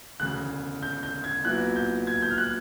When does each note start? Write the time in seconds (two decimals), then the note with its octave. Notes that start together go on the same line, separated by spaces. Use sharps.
0.20 E1 D2 C#3 F#6
0.83 G6
1.03 G6
1.24 G#6
1.45 C2 A#2 F#3 B3 E4 F#6
1.76 G6
2.07 G#6
2.22 G6
2.31 F6
2.38 F#6